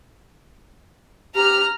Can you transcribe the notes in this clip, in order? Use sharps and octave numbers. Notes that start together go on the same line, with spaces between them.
G4 A#5 F6